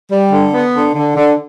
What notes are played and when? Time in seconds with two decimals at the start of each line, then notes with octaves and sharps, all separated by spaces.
0.11 G3
0.31 D3
0.52 B3
0.74 D3
0.95 D3
1.16 D3